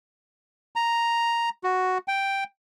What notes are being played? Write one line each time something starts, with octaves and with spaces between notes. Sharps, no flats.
A#5
F#4
G5